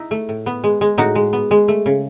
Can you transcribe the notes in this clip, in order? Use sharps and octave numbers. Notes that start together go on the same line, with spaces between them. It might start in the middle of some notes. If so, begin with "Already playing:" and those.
Already playing: D#4 E4
A3
A2
B3
G#3
G#3
A2 D#4 F#4
G#3
B3
G#3
A3
C#3